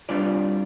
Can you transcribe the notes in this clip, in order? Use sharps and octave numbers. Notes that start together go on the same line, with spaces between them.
C2 C3 G3 D4 F4 D5